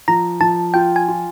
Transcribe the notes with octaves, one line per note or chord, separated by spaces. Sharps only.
F3 A#5
F3 A5
F4 G5
G#5
F4